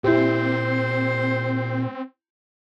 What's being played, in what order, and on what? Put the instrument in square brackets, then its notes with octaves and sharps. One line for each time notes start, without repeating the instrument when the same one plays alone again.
[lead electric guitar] A#2 [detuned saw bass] C4 [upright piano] E4 G4 [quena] C5